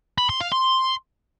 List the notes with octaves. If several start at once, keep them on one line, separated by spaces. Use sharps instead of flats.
B5
C6
F5
C6